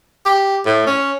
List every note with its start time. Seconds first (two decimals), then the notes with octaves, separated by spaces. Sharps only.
0.26 G4
0.66 A2
0.87 C#4